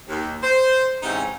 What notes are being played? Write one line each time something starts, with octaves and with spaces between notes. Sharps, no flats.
D#2
C5
G#2 C3 E3 C4 C#4 D#4